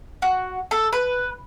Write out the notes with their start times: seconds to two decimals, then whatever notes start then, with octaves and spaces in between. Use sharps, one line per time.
0.22 F#4
0.71 A4
0.93 B4